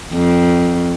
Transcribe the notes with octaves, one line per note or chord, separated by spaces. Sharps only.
F2